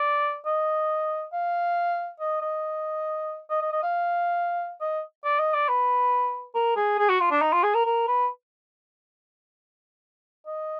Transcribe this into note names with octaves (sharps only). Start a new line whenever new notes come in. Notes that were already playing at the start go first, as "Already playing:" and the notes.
Already playing: D5
D#5
F5
D#5
D#5
D#5
D#5
D#5
F5
D#5
D5
D#5
D5
B4
A#4
G#4
G#4
F#4
F4
D4
D#4
F4
G#4
A#4
A#4
B4
D#5